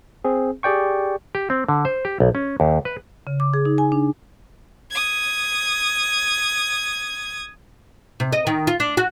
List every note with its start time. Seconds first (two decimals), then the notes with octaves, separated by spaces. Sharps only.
0.24 C4 G#4
0.63 G4 G#4 D5 G5 C#6
1.35 G4
1.50 C4
1.68 D3
1.85 C5
2.05 G4
2.20 B1
2.35 C#4
2.60 D#2
2.85 B4
3.27 C#3
3.40 D6
3.54 G#4
3.65 D#4
3.78 G#5
3.92 D4
4.91 D#6 G#6
8.20 C3
8.32 D#5
8.47 D#3
8.67 F4
8.80 D4
8.97 F#4